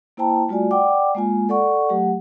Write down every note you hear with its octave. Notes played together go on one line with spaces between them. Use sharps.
A#3 E4 C5 G5 A5 A#5
G3 A3 F4 F#4 D5 G#5
D5 F#5 G5 D6
G#3 A#3 F4 G#5
A4 D5 F#5 C#6
F#3 A3 G4 F#5